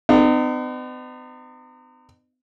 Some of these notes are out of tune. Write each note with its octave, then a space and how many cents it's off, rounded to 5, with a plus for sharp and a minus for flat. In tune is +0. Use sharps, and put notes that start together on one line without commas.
B3 +45 D#4 -40